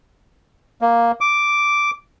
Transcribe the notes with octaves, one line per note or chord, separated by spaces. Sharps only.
A#3
D6